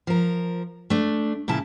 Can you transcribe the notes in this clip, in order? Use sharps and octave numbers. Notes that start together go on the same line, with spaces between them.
F3 A#4
A3 D4
A#2 C#3 E4 A5